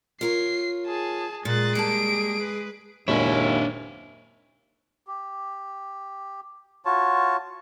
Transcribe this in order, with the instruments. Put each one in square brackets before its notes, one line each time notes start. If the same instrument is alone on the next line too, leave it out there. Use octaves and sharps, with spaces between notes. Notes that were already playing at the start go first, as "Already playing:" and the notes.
[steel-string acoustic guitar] F4 A#4 C#5 [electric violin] C7
[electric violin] G#4 A5
[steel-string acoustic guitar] A#2 [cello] G#3 G#4 [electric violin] F#6 A6
[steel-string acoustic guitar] G3 A#3 A5 [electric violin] D7
[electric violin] B4
[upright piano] F#1 A#2 G#3 [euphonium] D#2 [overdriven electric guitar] D4 C#5 [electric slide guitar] E4
[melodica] G4
F4 F#4 C#5 A5